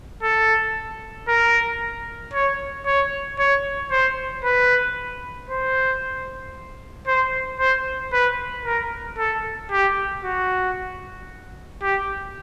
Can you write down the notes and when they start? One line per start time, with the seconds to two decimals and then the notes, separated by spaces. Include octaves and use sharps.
0.23 A4
1.28 A#4
2.34 C#5
2.86 C#5
3.39 C#5
3.91 C5
4.44 B4
5.49 C5
7.07 C5
7.60 C5
8.13 B4
8.65 A#4
9.18 A4
9.71 G4
10.23 F#4
11.82 G4